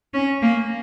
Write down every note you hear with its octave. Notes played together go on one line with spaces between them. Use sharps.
C#4
A#3